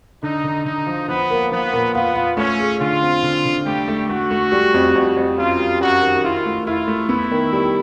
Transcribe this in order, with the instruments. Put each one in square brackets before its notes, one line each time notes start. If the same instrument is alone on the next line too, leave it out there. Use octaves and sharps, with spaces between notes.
[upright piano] D3 [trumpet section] D#4
[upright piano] D3
[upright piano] D3 [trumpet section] D#4
[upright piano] F3
[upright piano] F3 [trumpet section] B3
[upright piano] A#3
[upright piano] F3 [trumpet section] B3
[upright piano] A#2
[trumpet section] B3 [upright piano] F4
[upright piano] F4
[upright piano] A3 [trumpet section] C#4
[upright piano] G#4
[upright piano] D3 [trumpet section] F4
[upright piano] C4
D3
D3
[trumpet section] G3 G4 [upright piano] A3
[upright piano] A3
[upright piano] A3 [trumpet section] F#4
[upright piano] A3
G3
F2
F2
F2
[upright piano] F#2 [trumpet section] F4
[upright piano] G3
[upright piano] F#2 [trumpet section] F#4
[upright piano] D#3
[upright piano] E4 [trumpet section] F4
[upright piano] A3
[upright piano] E4 [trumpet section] F4
[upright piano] A3
[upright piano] B3 [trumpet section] E4
[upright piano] D#3
G3